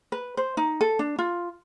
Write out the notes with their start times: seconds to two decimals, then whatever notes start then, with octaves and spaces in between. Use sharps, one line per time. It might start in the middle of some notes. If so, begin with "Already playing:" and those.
0.12 B4
0.37 C5
0.57 D#4
0.81 A4
0.99 D4
1.19 F4